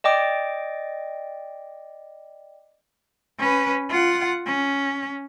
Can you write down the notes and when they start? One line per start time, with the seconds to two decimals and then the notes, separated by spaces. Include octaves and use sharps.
0.04 D5 D#5 G5 D6
3.38 C#4 B4
3.89 F4 F#5
4.46 C#4